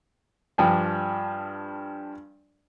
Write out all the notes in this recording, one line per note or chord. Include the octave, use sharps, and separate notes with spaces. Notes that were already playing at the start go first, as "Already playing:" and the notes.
G2 F3 D4 G5 G#5